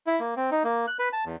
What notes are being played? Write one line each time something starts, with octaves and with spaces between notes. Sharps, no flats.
E4
A#3
C4
D#4
A#3
F#6
B4
A5
E2